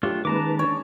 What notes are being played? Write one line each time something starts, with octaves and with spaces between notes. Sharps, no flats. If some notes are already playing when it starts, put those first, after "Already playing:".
F#3 A3 D4 F4 G4 C#5
D#3 G#3 A#3 C#4 B4 A5 A#5 D6
D4 C#5